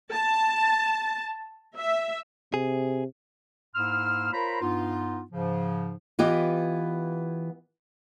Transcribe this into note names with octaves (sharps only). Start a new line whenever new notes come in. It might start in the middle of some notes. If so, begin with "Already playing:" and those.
A5
E5
C3 G#4
G#2 A#3 E4 C6 E6 F6
F4 A#4 C5 C#5 A#5 B5
G2 B3 D#4 F4
G#2 C#3 F3
E3 B3 F4 G4 D#5